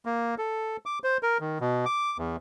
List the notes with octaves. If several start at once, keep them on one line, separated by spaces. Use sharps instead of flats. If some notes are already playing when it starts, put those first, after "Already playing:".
A#3
A4
D6
C5
A#4
D#3
B2
D6
E2